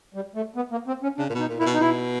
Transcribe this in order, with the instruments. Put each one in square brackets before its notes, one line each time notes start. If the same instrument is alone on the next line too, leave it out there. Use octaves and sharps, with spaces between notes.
[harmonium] G3
A3
B3
A#3
C4
C#4
[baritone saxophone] C#3 [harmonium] D4
[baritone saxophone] A#2
[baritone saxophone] B2 [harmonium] D#4
[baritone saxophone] A#2
[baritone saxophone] A#2 [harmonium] E4
[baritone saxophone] B2
[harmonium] D#4
[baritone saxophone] B2 [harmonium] E4